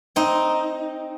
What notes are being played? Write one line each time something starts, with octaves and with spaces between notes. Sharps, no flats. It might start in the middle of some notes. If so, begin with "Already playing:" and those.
C4 D#4